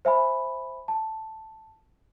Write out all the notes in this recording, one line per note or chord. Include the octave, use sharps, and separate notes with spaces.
C5 E5 G#5 B5
A5